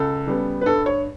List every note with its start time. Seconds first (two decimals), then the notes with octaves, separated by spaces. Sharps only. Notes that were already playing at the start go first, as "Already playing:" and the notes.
Already playing: C#2 A4
0.27 C#3 G3 B3
0.61 B4
0.66 G2 A4
0.86 C#5